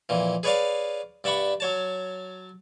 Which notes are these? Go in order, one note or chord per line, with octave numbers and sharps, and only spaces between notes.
F2 A#2 E3
G#4 B4 C#5 D5 F5
G2 D5 E5 F#5 B5 C#6
F#3 C#5 A5